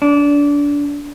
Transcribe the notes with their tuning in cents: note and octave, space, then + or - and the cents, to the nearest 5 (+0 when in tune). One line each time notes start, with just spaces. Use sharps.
D4 -25